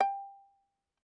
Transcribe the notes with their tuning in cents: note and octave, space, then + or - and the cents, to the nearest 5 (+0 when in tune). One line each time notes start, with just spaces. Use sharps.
G5 +20